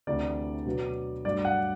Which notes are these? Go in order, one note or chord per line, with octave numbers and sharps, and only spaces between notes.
D2 C3 E3 A3 D5
B2 F#3 B3
G2 F#3 A3 D5
F#5